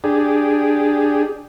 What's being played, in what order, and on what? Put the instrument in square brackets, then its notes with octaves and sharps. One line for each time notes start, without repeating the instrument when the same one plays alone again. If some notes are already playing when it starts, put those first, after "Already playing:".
[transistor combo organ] D4 G4 G#4